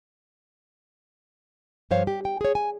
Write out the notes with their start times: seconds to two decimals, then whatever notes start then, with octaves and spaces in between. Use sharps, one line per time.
1.91 G2 F3 C5 C#5 F5
2.07 G4
2.25 G5
2.41 G#4 C#5
2.55 G#5